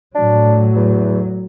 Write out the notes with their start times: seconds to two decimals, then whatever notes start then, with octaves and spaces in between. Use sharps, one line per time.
0.15 A2 F#3 D4
0.75 E2